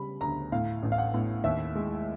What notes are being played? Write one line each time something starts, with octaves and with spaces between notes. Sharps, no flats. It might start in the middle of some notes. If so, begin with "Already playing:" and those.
Already playing: C#3 G3 B5
D2 A#5
A2 F5
A1
F5
F#5
A2
D#2 E5
G#3